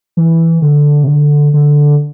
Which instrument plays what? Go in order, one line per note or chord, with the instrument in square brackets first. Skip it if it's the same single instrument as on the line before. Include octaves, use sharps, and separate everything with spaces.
[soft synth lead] E3
D3
C3
D3
D3